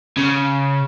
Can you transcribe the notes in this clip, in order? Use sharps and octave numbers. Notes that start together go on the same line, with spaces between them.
C#3